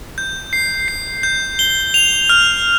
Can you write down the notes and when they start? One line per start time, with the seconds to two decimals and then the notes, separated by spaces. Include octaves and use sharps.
0.18 G6
0.53 C7
0.88 C7
1.23 G6
1.59 G7
1.94 F7
2.29 F6